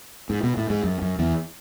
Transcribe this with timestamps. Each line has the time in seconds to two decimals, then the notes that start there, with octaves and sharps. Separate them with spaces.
0.30 G#2
0.43 B2
0.57 A2
0.70 G#2
0.84 F#2
1.02 F#2
1.19 E2